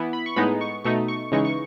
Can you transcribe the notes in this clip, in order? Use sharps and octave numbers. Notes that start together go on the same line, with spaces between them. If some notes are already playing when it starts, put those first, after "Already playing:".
Already playing: E3 B3 E4
B5
C#6
A2 G#3 B3 D#4 B5
C#6
B2 A3 D#4 C#6
C#6
C#3 E3 G#3 D#4 C#6
C#6